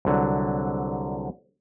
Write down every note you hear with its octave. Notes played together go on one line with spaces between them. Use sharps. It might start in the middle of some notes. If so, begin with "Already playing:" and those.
C2 D3 F#3